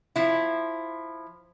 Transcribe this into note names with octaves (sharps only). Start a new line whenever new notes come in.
F3 E4